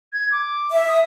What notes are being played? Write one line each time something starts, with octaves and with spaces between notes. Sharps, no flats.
G#6
D6
E5
D#6